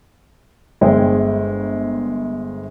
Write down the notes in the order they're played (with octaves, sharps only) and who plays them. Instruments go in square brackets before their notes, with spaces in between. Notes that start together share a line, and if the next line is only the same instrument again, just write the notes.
[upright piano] G1 G#3 C5 E5 G5 G#5